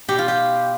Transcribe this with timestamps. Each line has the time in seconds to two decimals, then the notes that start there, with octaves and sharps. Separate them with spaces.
0.08 B2 G4
0.18 F4
0.28 G4